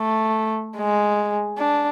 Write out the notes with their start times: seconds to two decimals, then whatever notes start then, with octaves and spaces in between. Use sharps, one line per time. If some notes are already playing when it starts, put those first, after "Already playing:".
Already playing: A3
0.77 G#3
1.59 D4